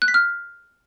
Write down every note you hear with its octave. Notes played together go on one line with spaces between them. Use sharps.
F#6
B6
F6